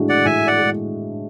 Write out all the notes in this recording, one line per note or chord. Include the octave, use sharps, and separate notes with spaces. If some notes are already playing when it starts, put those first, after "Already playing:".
Already playing: A2 G#3 D4 F#4
D5 F#5
A2 E5 G#5
D5 F#5
G#3